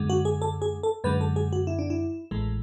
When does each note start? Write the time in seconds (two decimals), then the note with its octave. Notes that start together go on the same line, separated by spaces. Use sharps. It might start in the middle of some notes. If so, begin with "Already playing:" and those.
Already playing: F#2 D3 G#3
0.10 F#4
0.25 G#4
0.42 A4
0.62 G#4
0.83 A4
1.04 F#2 D3 G#3 B4
1.21 A4
1.36 G#4
1.53 F#4
1.67 E4
1.79 D4
1.90 E4
2.31 A1 A2 E3 G#3